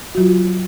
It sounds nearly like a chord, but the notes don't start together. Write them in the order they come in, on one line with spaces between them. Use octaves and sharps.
F#4 F#3 F4